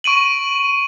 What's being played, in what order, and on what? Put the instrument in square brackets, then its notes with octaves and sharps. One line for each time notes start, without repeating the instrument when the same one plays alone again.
[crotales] C#6 D7 D#7 F#7